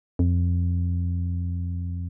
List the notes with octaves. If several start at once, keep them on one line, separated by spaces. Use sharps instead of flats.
F2